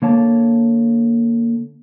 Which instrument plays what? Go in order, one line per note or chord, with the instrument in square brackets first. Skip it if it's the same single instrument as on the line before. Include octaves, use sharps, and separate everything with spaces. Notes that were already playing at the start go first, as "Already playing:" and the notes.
[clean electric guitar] D3 A#3 C#5 A5